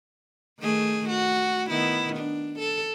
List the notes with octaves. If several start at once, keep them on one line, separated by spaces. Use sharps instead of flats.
D#3 A3 G#4
F#4
D#3 B3 E4
D4
A4